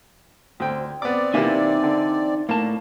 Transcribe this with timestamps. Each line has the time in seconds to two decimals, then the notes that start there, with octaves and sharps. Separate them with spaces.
0.60 D2 C4 G5
1.02 B3 C4 D5 D6
1.34 C3 E3 A#3 D#4 E5 G#5
1.83 D3
2.49 A2 A#3 A5